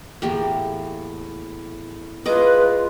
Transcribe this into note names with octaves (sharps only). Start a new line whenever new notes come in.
E2 A2 A#3 G4
G#3 B3 F4 A#4 B4 D#5 D6